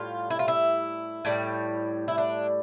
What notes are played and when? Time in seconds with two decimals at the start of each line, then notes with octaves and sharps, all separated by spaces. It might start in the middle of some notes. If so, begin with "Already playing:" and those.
Already playing: A2 G3 F4
0.30 E4
0.39 F4
0.48 E4
1.25 A2 G3
2.08 E4
2.18 D4